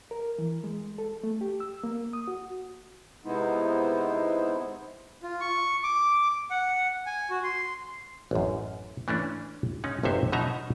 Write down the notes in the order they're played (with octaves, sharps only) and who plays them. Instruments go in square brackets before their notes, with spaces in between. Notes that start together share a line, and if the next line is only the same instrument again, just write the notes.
[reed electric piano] A#4
E3
G#3
A4
A3
G4
E6
A#3
D#6
F#4
[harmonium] C3 G#3 B3 D#4 E4 C5
[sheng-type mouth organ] F4
C#6
D6
F#5
G#5
F#4
C6
[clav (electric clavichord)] A1 F#2
E3 A3 C#4 D4
G#3 C#4 D#4
G1 F2 C3 F#4 C5 E5
B2 F3 F#3 D#4 E5 A#5